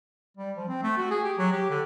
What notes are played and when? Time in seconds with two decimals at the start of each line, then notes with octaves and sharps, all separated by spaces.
0.37 G3
0.57 F3
0.68 C4
0.83 A3
0.97 F#4
1.11 G#4
1.24 G4
1.38 F#3
1.52 G4
1.70 D3